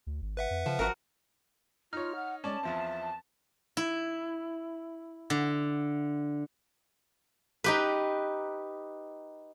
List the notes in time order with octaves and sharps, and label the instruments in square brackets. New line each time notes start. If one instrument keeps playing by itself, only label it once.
[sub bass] D2
G#1
[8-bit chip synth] B4 E5 F#5
[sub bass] F2
[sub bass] C#3 [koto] F3
[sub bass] G#1 [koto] F#4 A#4
[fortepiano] D#4 C#5 [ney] F4 [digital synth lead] F6
[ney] F#5
[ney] G#3 [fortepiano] C#4 D5 [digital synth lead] A5
[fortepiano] E2 F3 C4 [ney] E5
[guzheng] E4
D3
D#4 G4 B4